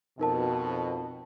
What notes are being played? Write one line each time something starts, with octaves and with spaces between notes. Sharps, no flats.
F2 B2 D#4 A#4 A5